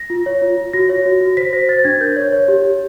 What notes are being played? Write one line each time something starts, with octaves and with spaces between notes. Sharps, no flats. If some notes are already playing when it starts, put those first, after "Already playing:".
Already playing: A#6
F4
C#5
F4
F4
F#4 A#6
C#5
F#4
F#4
C5 B6
C5 A#6
C5 A6
A6
D4 G#6
A#4 G6
C#5
C#5
G4
G4